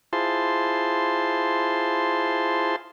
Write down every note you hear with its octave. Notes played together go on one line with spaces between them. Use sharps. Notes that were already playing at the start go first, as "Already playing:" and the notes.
E4 F4 G#4 C5 A5 C6